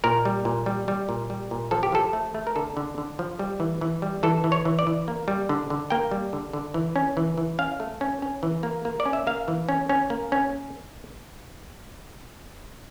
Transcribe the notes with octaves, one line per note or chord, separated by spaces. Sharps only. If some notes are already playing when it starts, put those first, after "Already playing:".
A#2 A#4
G3
A#2
G3
G3
A#2
G3
A#2
F3 A4
G4
F3 A4
A3
A3
A#4
D3 A4
D3
D3
F3
G3
E3
E3
G3
E3 A4
E3
C#5
E3
D5
E3
A#3
G3
D3
D3
A#3 G5
G3
D3
D3
E3
C#4
E3
E3
C#4 F5
A3
C#4
C#4
E3
A#3
A#3
D5
C#4
E5
A#3 F5
E3
C#4
C#4
A#3
C#4